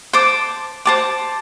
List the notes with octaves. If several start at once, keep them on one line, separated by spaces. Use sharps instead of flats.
C5 A5 D6
C5 A5 D6